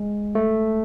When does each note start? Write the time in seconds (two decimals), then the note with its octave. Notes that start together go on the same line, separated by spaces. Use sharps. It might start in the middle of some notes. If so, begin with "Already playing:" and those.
Already playing: G#3
0.35 A3